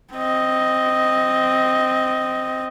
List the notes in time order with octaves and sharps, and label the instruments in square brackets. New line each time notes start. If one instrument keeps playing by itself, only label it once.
[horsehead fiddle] C4 D#5